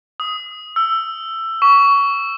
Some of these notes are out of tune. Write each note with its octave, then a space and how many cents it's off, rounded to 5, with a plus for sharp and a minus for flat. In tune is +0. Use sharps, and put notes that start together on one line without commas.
D#6 +15
E6 +15
C#6 +20